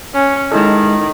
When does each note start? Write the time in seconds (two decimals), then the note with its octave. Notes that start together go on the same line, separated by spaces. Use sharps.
0.14 C#4
0.52 D#3 G#3 E4 A4